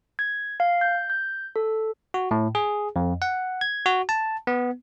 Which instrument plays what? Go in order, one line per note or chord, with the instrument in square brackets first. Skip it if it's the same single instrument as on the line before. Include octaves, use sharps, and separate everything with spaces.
[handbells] G#6
F5
G6
G6
A4
[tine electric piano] F#4
A2
G#4
F2
F#5
G#6
F#4
A5
B3